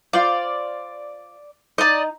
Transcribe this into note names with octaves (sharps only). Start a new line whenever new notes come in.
F4 C5 D5 F5
D#4 D5 D#5 A#5